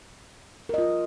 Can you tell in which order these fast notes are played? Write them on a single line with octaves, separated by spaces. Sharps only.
A#4 D#5 F4